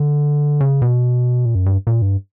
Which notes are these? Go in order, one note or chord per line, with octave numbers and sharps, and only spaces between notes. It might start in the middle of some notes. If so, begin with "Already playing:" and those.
Already playing: D3
C#3
B2
A#2
F#2
G2
A#2
G2